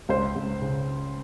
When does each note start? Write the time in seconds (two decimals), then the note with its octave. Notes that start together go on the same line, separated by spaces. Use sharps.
0.09 C#2 C5
0.36 C#2
0.61 C#3